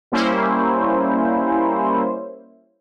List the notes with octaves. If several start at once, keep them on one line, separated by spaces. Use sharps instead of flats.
G3 A#3 C#4 E4 C5